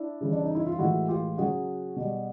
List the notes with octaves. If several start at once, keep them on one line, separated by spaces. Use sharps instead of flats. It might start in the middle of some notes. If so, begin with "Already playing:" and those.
Already playing: D4 E4
C#3 E3 G3
D4
D#4
E4
F4
A2 E3 G#3 E4 F#4
F4 G4
C#3 F#3 F#4 G#4
B2 G3